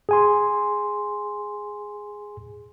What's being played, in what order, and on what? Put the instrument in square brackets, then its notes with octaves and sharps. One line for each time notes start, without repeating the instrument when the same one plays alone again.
[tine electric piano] G#4 G#5 C6